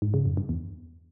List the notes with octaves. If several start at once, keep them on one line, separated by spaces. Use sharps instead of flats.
G#2
C#3
F#2
G2
E2